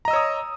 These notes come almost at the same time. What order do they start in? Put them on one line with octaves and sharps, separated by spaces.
A#5 D#5 E6 C#5 D#6